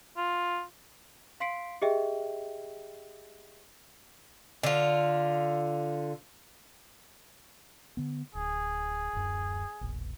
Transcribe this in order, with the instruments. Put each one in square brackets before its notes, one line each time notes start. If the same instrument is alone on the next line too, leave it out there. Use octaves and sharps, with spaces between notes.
[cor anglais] F4
[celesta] F5 C6 B6 C7 D7
G4 G#4 D#5 E5 G5
[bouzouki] D3 F4
[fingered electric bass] D3 B3
[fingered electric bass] D1 [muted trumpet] G#4
[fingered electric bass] D1 F#2
E1 A#1